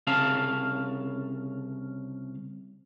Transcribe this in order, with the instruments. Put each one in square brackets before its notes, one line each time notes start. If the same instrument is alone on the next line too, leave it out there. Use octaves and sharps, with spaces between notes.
[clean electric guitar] C2 C#3 C#4 F5 A5